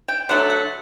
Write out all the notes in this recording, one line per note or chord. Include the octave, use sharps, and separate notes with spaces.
G5
D3 F#3 A3 F#5
F#5